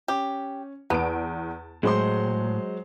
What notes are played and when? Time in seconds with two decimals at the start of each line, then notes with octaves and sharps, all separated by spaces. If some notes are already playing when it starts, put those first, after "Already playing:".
0.08 C#4 G4
0.90 E2 B3 A5 D7
1.83 A2 F#3 G#3 C5 C6